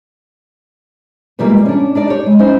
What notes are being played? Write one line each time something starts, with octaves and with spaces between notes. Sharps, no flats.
B2 E3 G3 G#3 A#3 F4
C#4 D4
D4 D#4 D5
G4 C#5
G#3
F#3 C#4 D#4 E4 C5